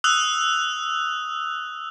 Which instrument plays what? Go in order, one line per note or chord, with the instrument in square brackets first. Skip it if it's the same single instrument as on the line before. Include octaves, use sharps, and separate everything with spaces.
[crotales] D#6 E6 F#6 F7